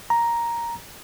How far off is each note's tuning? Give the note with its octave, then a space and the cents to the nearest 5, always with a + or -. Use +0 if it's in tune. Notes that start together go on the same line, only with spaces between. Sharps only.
A#5 +5